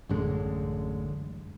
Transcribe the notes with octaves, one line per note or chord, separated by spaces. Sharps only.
A1 F#2 D3 G#3